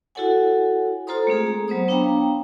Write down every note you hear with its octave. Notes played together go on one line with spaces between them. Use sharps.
E4 F#4 A4 C#5 F#5 G#5
F4 A4 C5 A#5 C6 D#6
G#3 A3 C4 G#4
A#5
F#3 B3 C5 D#6
B3 D4 C#5 F5 G5 A#5